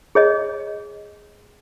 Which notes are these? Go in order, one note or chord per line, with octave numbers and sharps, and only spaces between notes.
G#4 C#5 D#5